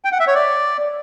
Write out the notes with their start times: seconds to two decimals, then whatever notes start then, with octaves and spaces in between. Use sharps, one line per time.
0.05 G5
0.12 F#5
0.20 E5
0.27 C#5
0.35 D5